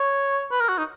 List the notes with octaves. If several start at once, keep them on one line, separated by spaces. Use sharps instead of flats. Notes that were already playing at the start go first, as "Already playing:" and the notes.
Already playing: C#5
B4
A#4
F#4
D#4